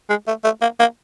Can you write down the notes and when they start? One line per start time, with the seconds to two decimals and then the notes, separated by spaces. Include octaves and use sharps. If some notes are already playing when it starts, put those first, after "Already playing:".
0.09 G#3
0.27 A3
0.44 A3
0.62 A#3
0.80 A#3